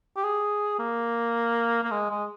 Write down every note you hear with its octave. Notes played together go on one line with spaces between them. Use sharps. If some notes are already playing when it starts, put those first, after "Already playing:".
G4
G#4
A#3
A#3
G#3
G#3